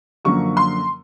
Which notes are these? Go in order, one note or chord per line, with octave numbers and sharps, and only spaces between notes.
F#2 D3 F3 A#3 C#6
C6